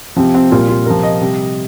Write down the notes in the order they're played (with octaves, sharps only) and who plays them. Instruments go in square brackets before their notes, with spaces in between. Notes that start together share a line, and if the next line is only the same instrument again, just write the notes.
[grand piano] C3 F3 C4
C4
A#2 G3 F4
F4
C3 F3 A#4
D#5
C3 G3